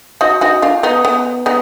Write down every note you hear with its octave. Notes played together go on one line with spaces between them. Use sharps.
D#4 F#4
D#4 F#4
D4 F4
B3 D#4
B3
B3 D#4